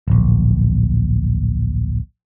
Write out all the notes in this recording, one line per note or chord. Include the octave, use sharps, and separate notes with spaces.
D1 A#1